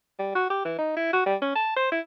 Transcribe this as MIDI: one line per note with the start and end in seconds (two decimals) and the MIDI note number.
0.19 0.33 55
0.35 0.47 66
0.50 0.61 67
0.65 0.77 52
0.78 0.94 63
0.97 1.13 64
1.13 1.24 66
1.26 1.36 55
1.42 1.55 61
1.55 1.71 81
1.76 1.89 72
1.92 2.00 64